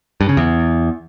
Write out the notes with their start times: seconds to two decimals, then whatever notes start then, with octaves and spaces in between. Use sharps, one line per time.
0.21 G2
0.29 C#3
0.37 E2